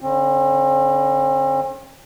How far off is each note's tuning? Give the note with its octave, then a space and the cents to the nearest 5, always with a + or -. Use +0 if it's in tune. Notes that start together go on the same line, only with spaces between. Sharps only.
D3 -20 C4 +45